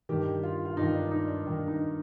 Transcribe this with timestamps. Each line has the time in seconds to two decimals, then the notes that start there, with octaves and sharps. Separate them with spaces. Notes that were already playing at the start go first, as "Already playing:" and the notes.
0.09 G2 D#3 G4
0.43 F4
0.65 F4
0.77 G2 D#3 D#4
0.94 D4
1.11 D#4
1.28 D4
1.45 G2 D#3
1.68 D#4